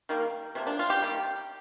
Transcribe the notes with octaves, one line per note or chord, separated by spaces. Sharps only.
D#3 G3 A#3
C3 F3 A#3
D4
F4
G4
D#3 G3 A#3